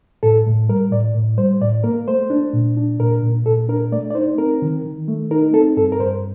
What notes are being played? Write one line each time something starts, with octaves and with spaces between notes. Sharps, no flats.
A2 A4
A2
G3 A#4
A2 D5
A2
G3 C5
A2 D5
A#3 A#4
A3 C5
D4
A#2
D4
A#2 A#4
A#2
A#2 A4
D4 A#4
A3 D5
D5
D#4 C5
C4 A#4
D#3
D#3
A3
D#4 A#4
C4 A4
G2 A4
A#4
G2 C5